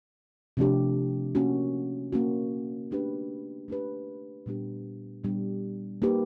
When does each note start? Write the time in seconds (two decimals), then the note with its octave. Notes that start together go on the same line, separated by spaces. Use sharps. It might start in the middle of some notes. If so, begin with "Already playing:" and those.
0.57 C3 F3 A3 D4 G4
1.35 A#3 C#4 F#4
2.12 A#3 C#4 F#4
2.91 A3 D4 G4 B4
3.68 A3 D4 G4 B4
4.46 A#2 G3 B3 D4 G4
5.24 A#2 G3 B3 D4 G4
6.02 A#3 D#4 G4 B4